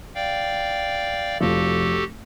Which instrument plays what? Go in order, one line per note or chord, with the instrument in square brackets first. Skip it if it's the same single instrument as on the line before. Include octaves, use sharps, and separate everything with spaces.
[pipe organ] D5 F5 G5
[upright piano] F1 F3 [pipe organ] F#4 G4 A4